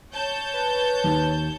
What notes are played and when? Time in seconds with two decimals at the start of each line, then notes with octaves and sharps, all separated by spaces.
0.14 C#5 A5 G6
0.53 B4
1.04 D#2